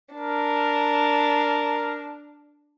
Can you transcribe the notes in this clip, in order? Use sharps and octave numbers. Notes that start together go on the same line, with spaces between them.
D4 A#4